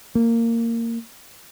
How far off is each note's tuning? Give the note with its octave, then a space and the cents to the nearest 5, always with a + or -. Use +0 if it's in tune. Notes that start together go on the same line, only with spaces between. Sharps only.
A#3 -15